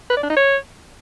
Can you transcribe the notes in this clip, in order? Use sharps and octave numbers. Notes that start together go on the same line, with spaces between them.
B4
D5
D4
D#4
C#5